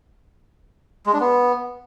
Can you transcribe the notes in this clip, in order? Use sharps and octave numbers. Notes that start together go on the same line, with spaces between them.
G#3
D4
B3